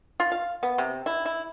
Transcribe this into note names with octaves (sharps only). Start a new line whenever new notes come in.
F4
F5
B3
C3
E4
E4